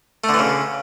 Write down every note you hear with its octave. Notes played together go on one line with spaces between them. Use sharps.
A3
D3
E3
C#3